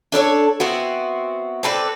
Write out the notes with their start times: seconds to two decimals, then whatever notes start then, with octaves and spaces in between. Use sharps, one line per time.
0.12 D4 A4 A#4 C#5
0.60 B3 C4 E4 F#4
1.63 C4 A4 B4 D5